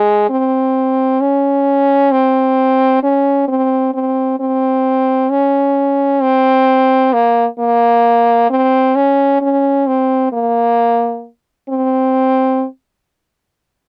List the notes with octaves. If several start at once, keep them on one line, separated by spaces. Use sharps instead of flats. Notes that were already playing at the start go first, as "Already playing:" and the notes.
Already playing: G#3
C4
C#4
C4
C#4
C4
C4
C4
C#4
C4
A#3
A#3
C4
C#4
C#4
C4
A#3
C4